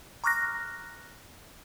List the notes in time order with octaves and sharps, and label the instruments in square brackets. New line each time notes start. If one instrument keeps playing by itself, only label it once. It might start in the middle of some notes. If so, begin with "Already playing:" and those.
[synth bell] A#5 C#6 D6 F6 F#6 A#6